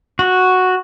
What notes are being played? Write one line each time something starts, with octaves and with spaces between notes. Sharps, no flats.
F#4